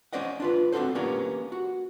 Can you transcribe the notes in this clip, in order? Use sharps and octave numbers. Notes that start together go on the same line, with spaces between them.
C#4 C5 D5 D#5 F#5
D4 F4 B4
C4 D4 D#4 F#4 A4 C5
A#3 B3 C#4 D4 G4 A#4
F#4